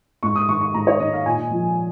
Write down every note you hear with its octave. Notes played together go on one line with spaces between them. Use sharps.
G#2 C#6
D#6
D#3 C#6
C#6
G#2 A#5
C#5
D#3 D#5
F5
A#2 G#5
F3